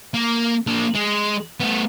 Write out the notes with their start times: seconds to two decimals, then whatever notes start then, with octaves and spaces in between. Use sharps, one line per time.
0.14 A#3
0.67 A#3 D4
0.95 G#3
1.60 A3 B3